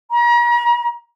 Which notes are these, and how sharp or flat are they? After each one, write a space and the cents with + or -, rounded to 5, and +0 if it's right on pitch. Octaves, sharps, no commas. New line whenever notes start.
A#5 +40